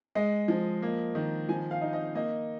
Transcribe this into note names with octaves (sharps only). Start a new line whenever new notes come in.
G#3 D#5
F3
A#3
D#3
F3 G#5
F5
D#4
D#5
A#3 D#5